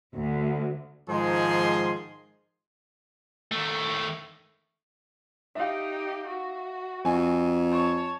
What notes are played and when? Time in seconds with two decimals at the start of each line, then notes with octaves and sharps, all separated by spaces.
0.14 D2
1.09 G#2 D#3 F3 G#3 G#4 C6
3.52 D#3 A3
5.55 D#4 G4 E5 F5
6.28 F#4
7.05 F2 G#5
7.71 C#5 A5